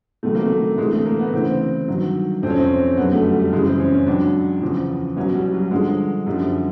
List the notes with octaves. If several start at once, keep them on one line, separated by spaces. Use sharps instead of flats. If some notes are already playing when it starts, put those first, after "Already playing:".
C#2 C3 D#3 F#3 A3
A#3
A3
D2 C3 E3 G#3
A3
A#3
B3
D2 C#3 E3 C4
G2 D#3 F#3
F2 C3 F3 C4
C#4
C4
F#2 D3 F#3 B3
A3
G3
G3
F#2 C#3 E3 G#3
C4
C#4
C#4
C#2 C#3 F#3 D4
E2 C#3 F3
C2 B2 F#3 C#4
G3
F#3
G2 D3 F3 G#3
F#2 D3 F3 G3